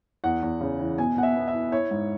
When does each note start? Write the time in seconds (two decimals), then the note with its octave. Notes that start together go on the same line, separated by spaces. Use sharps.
0.24 E2 F#5
0.42 E2
0.61 C#3
0.79 E3
0.98 B2 G#5
1.17 B2 F#5
1.23 E5
1.35 B3
1.48 E5
1.54 E4
1.72 E4 C#5
1.91 G#2